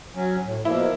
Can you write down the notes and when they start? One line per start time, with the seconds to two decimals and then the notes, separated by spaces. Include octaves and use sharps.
0.15 F#3 C#4
0.42 A2
0.65 B2 F3 A#3 E4